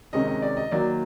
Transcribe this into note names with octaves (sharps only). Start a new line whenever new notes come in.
C3 D#3 G#3 C#4 D#5
D#5
D5
D#5
D#3 F#3 A#3 D5